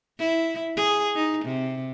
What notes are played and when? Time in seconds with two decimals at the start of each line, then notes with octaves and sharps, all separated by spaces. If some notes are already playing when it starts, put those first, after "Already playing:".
0.18 E4
0.77 G#4
1.16 D#4
1.45 C3